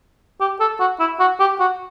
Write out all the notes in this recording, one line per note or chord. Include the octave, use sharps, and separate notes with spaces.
G4
A4
F#4
E4
F#4
G4
F#4